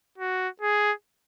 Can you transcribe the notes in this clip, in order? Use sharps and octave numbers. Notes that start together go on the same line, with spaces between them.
F#4
G#4